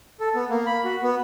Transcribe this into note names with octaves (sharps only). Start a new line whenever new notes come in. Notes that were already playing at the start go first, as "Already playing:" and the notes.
A4
B3
A#3
B5
F#4
B3